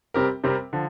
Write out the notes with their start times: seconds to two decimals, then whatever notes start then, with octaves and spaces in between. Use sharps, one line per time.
0.14 C3 G3 C4 G4 A#4
0.44 C3 G3 C4 G4 A#4
0.73 D3 F3